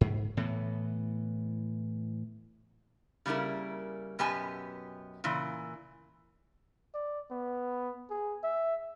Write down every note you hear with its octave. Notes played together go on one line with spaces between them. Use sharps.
G#2
A2 E3 B3
C#3 G3 A#3 E4 A#4
F#2 B2 B3 G4 G#5 A5
A#2 C#3 E3
D5
B3
G#4
E5